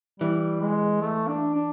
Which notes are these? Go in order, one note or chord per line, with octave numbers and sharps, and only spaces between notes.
E3 G3
G#3
A3
D4
D4